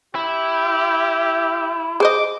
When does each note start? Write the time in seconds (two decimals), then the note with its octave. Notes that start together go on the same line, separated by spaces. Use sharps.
0.15 E4 G4
2.00 G#4 C5 D#5 D6